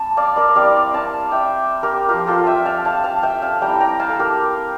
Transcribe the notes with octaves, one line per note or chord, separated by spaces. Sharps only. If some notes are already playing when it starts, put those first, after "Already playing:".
Already playing: G3 C4 A5
D5 F5
A#4 D5
G3 C4 E4 D5 F5
F5 A5
E5 G5
G4 A#4
F3 C4 F4 G4 A#4
F4 A4
E5 G5
F5 A5
F5 A5
F5 A5
E5 G5
F5 A5
G3 C4 E4 G5 A#5
G5 A#5
F5 A5
A4
G4 A#4